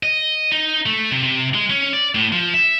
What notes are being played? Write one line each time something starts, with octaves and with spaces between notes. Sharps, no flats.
D#5
D#4
A3
C3
C3
G#3
C#4
D5
A2
F3
E5